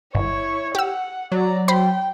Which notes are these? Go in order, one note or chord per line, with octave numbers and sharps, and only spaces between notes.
G1 E4 C#5
G4 F#5 E6
F#3 D5 A#5
C5 G5 B5 C6